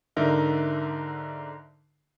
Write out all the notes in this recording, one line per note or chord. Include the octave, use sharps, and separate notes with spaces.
G#2 D3 D#4 A#4 E5